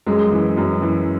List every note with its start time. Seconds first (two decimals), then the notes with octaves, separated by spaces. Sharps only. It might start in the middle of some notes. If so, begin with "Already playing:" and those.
0.07 F#2 G#3
0.32 E3
0.57 F#2
0.82 E3